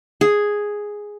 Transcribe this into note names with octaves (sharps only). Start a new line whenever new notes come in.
G#4